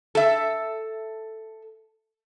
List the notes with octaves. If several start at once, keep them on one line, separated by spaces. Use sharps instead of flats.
A4 E5